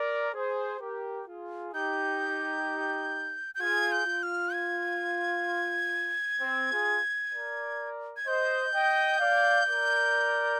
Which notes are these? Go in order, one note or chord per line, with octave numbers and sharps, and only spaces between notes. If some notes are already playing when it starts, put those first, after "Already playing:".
Already playing: A#4 D5
G#4 C5
G4 A#4
F4 G#4
D#4 G4 G6
G6
F4 G#4 G#6
G6
F4
F6
G#6
C4
F4 G#4
A#4 D5
G#6
C5 D#5 G6
D#5 G5
D5 F5
A#4 D5